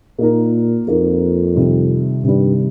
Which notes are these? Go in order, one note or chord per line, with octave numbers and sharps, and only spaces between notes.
A#2 A#3 D#4 A#4
F2 A#3 D#4 A#4
C3 D#3 G3
G2 C3 D#3 G3